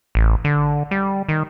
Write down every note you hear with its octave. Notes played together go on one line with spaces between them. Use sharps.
A1
D3
G3
D#3